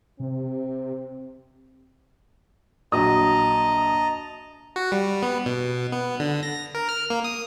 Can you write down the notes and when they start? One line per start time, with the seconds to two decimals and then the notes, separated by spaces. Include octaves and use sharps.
0.20 C3 C4
2.92 A#1 F#3 D#5 A5 A#5 D#6
4.76 F#4
4.92 G3
5.23 B3
5.46 B2
5.92 B3
6.20 D3
6.43 A#6
6.75 A#4
6.89 F6
7.10 A#3
7.24 D#6